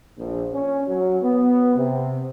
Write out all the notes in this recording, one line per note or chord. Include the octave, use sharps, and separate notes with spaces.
A#1
C#4
F#3
B3
C3